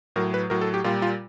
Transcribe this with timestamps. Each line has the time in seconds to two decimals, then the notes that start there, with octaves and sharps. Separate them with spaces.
0.16 A2 F#3 A#4
0.34 B4
0.50 A2 F#3 A#4
0.61 A4
0.74 G4
0.84 A#2 G3 F4
1.02 F4